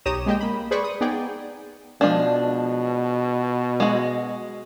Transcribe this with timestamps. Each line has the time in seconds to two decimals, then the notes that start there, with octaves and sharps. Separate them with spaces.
0.05 B1 G4 C#5 A#5 D#6 E7
0.26 G#3 A#3 G4 G#4 D#5 G5
0.40 A#3 B5
0.71 G#4 B4 C5 D5 B5 C#6
0.84 D#6
1.01 B3 D#4 G#4 D5 G5
2.01 B2 F3 G#3 D4
3.80 G#3 F#4